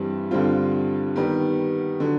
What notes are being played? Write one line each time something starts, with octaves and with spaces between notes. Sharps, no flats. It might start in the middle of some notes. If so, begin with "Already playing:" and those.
Already playing: G2 E3 G3 C4
G2 D3 G3 C4 F4
D#3 G3 B3
D3 F#3